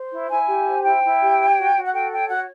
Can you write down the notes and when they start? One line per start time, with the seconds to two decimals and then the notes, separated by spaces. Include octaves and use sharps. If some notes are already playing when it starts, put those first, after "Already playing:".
Already playing: C5
0.12 E4
0.30 E4 G#5
0.47 G4
0.66 C5
0.83 E4 G5
1.03 E4
1.21 G4
1.39 C#5
1.57 F#4
1.75 F#4
1.84 F#5
1.92 A4 G5
2.11 C#5 G5
2.29 F#4 F#5